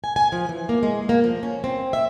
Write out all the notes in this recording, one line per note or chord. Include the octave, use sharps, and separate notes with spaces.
G#5
G#5
F3
E3
A#3
G#3
A#3
F3
C#4
C4
E5